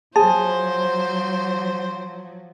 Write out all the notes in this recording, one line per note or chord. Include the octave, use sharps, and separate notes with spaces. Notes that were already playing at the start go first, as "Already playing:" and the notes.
F3 F#3 G#4 C5 A5